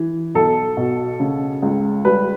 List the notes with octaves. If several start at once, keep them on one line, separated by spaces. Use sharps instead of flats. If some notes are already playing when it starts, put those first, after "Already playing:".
Already playing: E3
B1 A4
B2
C#3
C#2
G3 B4